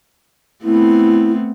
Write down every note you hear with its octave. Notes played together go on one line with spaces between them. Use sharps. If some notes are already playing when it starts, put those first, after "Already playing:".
A3 B3 C4 E4